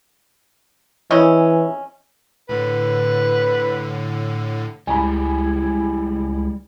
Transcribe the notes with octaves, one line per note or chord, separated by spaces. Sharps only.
E3 C4 C#4 E4 C#5 D#5
A2 D3 B4
C#2 G3 G#3 E4 G#5 B5